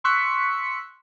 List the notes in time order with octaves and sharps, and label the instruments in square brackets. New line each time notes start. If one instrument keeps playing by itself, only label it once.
[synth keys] C6 C#6 E6 F#6 B6 C#7